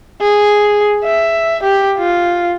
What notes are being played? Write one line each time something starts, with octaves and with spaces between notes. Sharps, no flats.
G#4
E5
G4
F4